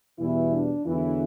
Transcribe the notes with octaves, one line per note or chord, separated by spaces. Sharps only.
E2 B2 E3 G3 B3 E4
D4
E2 D3 E3 F#3 E4